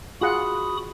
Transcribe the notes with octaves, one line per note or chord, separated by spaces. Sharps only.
F4 F#4 G#4 F#5 B5 D#6